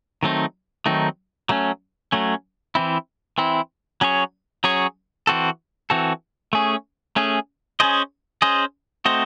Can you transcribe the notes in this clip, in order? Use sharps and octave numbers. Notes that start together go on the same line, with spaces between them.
D#3 F#3 A3 C4 D#4
D#3 F#3 A3 C4 D#4
F#3 A3 C#4
F#3 A3 C#4
E3 C4 E4
E3 C4 E4
F#3 C#4 G#4 C#5
F#3 C#4 G#4 C#5
E3 C4 F#4 A4
E3 C4 F#4 A4
A3 C#4 G#4
A3 C#4 G#4
C#4 G#4 C5 D#5
C#4 G#4 C5 D#5
A3 C4 F#4 C5 D#5